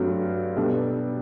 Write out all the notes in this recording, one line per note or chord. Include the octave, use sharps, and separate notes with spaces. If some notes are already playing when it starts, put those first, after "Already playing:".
Already playing: G2 F#3 A3 C4 F#4
B2 G3 D4 A4